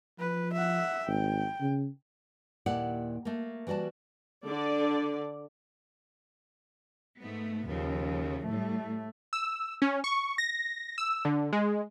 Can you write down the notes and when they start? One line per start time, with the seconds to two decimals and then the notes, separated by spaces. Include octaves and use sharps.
0.19 F3 B4
0.53 E5 F#5
1.07 G#1 G5
1.60 C#3
2.66 D#2 A#2 E4 G4 D5 F#5
3.25 A3 A#3
3.67 E3 G3 F#4 D5 A5
4.46 D3 D5
7.18 G#2 A3 B3
7.66 D#2 C#3 F3
8.46 A2 G3 A3
9.33 E6
9.82 C#4
10.04 C#6
10.38 A#6
10.98 E6
11.25 D3
11.53 G#3